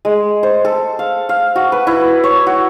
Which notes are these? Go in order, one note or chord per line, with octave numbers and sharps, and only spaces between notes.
G#3
C5
A4
F5
F5
F#4
B4
E4
C#5
F#4